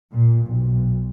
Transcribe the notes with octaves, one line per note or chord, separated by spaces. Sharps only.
A#2
B1